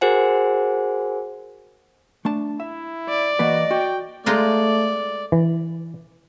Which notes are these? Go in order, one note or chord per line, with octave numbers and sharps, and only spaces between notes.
F#4 G#4 A#4 C5 F#5 G#5
A3 D4 A5
E4 E5
D5
E3 A#3 F#4 B4 D#5
F#4 G5
G#3 A3 D#4 F4 D5
E3